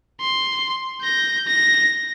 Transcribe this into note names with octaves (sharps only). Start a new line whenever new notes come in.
C6
G6 A#6
A#6